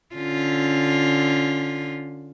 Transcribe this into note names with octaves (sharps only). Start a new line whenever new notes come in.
D3 C#4 F4